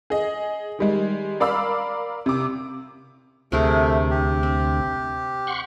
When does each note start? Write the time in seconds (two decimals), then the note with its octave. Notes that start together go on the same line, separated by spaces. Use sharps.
0.10 G#4 D#5
0.79 D#3 G3 G#3
1.40 A#4 D5 F5 B5 D6 E6
2.26 C3 D6
3.52 D2 C3 A3 G#4 A#4
4.11 G4
4.43 C4
5.47 F#5 C6 C#6